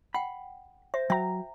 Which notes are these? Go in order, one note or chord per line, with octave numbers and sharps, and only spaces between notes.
F#5 G5 B5
C5 E5
F#3 E5 G5 A#5